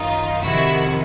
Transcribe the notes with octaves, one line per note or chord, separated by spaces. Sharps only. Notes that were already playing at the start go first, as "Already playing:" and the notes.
Already playing: F#2 D#3 D#4 F4
F2 C3 D#3 E4 F#4